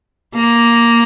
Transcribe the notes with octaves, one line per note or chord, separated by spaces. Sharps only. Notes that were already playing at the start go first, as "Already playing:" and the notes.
A#3